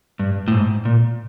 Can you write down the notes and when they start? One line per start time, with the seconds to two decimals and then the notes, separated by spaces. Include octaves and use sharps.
0.19 G2
0.48 A2
0.52 G#2
0.85 A#2